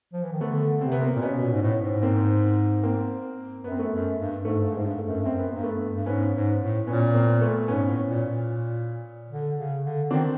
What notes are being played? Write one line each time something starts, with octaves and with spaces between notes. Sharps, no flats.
F3
E3
D#3
D3 A3 B3
C3 C4
B3
A#3 C4
A#2
B2 B3 C#4
A#2
G#2
A2
G#2
A#3 C4
A#3 C4
F#2 B3
C4
A3 B3
F#2
G2
G#2 A3
G2
G#2 G#3
G2
A3
F#2
G2
F#2 C4
B3
G2 A#3
A3 B3
G2
G#2 B3 C#4
G#2
A2
A#2 B3 C#4
A#3 C4
A3 B3
G#2 B3 C#4
A2
A#2
A#2
D3
C#3
D3
D#3 C4 D4